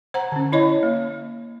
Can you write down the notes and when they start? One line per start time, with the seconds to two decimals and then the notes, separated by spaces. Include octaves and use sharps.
0.14 C5 F#5 A#5
0.32 D3 C#4
0.52 E4 C#5 D#5
0.83 A#3